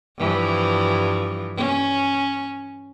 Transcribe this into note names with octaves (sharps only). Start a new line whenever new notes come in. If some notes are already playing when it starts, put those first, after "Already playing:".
G2 E3 F3
C#4